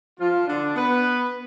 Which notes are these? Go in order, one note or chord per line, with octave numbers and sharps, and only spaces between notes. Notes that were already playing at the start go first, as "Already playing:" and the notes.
F3 F4
D3 D4
B3 B4